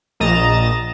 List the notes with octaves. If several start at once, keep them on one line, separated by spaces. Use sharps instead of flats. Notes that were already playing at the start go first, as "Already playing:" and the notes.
A#1 D#5 A#5 A6 E7